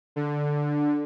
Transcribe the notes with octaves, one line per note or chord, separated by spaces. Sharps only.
D3